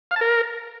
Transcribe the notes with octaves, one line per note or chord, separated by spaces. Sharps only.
F5
A5
A#4